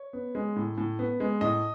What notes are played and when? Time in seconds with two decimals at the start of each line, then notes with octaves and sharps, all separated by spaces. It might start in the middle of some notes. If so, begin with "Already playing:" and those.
Already playing: C#5
0.13 B3
0.35 G#3
0.56 A2
0.78 A2
0.99 B3
1.20 G#3
1.41 A2 D#5